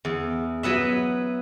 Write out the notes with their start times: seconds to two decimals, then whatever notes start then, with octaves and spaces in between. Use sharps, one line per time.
0.05 E2
0.63 F#3 B3 B4 E5